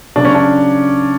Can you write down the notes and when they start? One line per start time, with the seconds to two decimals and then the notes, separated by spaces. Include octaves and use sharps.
0.16 C#3 F#3 D4
0.25 C#4
0.35 D4